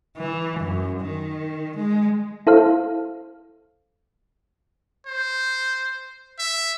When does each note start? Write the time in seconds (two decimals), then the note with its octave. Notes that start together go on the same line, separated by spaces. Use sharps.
0.17 E3
0.60 F#2
1.01 D#3
1.77 G#3
2.47 E4 A4 C5 F5
5.06 C5
6.39 E5